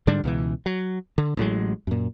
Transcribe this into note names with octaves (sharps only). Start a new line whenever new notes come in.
G#2 D3 G3 D4
C#2 B2 E3
F#3
D3
A1 A2 F#3 G#3
F#2 A#2